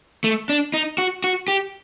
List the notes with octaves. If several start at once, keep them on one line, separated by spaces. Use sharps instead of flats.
A3
D4
D#4
F#4
F#4
G4